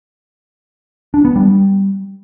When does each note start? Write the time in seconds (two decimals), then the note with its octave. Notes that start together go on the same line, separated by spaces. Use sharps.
1.14 D4
1.25 B3
1.36 G3